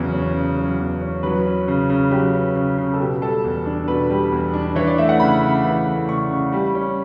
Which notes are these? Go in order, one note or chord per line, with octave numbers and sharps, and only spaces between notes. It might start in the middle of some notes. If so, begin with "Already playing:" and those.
Already playing: E2 C#3 F#3
C#4
C#3
F#3
E2
C#4
F#3 B4
C#4
C#3
C#3
F#3 G4
C#4
C#3
C#3
A4
B2 G4
G3 A4
E2
D4
B2 B4
G3
E2
D4
E3 C#5
D5
A3 E5
F#5
C#3 B5
C#3
E3
A3
C#3 C#6
C#3
G3
C#4